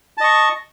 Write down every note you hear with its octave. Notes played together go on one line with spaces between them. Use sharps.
D#5 A5 C#6